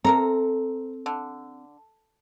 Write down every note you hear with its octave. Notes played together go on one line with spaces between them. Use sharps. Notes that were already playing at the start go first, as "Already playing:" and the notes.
C3 C4 A4 A#4 A#5
D3